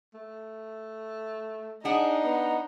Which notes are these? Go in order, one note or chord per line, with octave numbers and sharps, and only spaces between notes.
A3
D4 D#4 G#4 F#5
B3